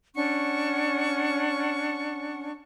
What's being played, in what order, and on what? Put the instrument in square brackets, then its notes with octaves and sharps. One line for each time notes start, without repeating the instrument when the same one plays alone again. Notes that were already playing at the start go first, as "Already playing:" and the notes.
[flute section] C#4 D4 F#5 C#6